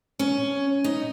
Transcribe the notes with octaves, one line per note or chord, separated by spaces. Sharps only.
C#4
D#4